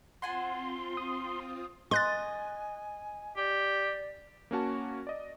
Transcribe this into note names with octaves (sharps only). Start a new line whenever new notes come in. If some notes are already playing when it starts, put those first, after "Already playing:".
C4 F4 F#5 G#5 A5 C6
D#6
D#5 G#5 C6 F#6 A6
G4 D5
A#3 C#4 F#4 A5
D5 D#5